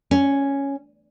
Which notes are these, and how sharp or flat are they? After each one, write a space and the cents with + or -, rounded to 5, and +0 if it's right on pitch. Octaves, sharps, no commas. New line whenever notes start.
C#4 +0